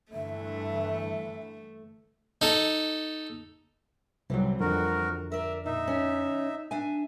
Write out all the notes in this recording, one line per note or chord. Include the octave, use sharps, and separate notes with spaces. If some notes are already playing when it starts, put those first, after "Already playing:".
G2 D3 E3 A3 E5
D#4 A4
C2 E3 F#3 G3 C4
F2 D3 F#4 A#4
A#4 D5 E5
A#2 D#4 E5
C#4
D4 E5 G#5